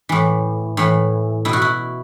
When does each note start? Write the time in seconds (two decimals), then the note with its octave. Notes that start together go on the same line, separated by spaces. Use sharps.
0.09 A2 E3
0.77 A2 E3
1.45 B2 E4
1.53 F#4
1.62 E4